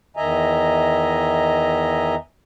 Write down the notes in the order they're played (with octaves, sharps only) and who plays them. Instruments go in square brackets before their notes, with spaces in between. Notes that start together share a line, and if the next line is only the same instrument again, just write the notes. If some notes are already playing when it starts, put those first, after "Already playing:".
[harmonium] E2 D#3 D#5 E5 G#5 A#5